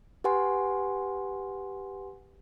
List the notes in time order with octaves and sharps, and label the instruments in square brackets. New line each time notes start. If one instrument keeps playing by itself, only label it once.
[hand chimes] G4 B4 F#5 G#5 C6